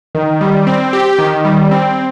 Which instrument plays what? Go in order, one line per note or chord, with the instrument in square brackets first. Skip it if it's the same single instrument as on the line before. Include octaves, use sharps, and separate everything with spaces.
[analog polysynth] D#3
G3
C4
G4
D#3
G3
C4